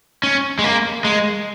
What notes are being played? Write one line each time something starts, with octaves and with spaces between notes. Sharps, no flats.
C#4
G#3
A#3
G#3